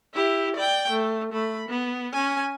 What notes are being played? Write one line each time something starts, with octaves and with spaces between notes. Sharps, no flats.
E4 G4
D5 G5
A3
A3 B5
B3
C#4 G#5